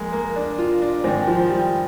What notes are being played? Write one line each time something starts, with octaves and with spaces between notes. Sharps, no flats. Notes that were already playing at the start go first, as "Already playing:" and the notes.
Already playing: F2 G#3 A#3
A#3
D4
F4
D4
G#2 D#3 C4
F3
G3